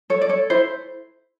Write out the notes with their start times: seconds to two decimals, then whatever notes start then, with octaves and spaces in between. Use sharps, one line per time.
0.10 A4 C#5
0.21 D5
0.29 A4 C#5
0.50 E4 C5